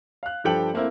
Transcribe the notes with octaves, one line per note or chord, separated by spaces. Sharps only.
F5 F#6
G2 F3 G4 A4 G5 F#7
A3 A#3 C4 E4